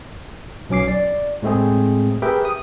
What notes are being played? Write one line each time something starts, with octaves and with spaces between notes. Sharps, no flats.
B1 F#3 C#4 D6 C7
D5
A2 G#3 A3 C4 G#4
G4 G#4 A#4 B4 E5 G5
D#6